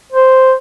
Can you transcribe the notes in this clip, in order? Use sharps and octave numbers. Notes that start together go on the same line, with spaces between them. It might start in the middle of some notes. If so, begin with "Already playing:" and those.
C5